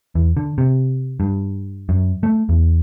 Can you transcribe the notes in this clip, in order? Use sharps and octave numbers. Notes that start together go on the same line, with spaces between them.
E2
D3
C3
G2
F#2
A3
E2